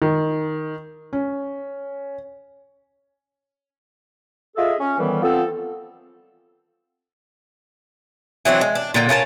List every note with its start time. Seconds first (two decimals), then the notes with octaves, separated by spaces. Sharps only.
0.02 D#3
1.13 C#4
4.57 F4 G#4 A4 D#5 E5
4.79 C#4
4.99 A2 D#3 E3 G3 B3
5.23 F3 B3 C4 A4
8.45 E3 F#3 C4 D4
8.61 G#3
8.75 D4
8.94 A#2 D3 F4 G5
9.09 C#4 F4 A#4 A5